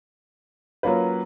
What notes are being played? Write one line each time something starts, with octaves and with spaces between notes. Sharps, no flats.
F#3 A#3 C#4 F4 B4